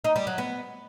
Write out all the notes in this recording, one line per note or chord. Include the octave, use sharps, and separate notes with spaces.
D#4
G3
F#3
B3